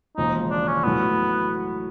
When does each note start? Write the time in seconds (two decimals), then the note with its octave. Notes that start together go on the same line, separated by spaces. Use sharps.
0.17 E1 D#2 C#3 F3 G#3 D#4
0.50 D4
0.67 C#4
0.84 A2 F#3 B3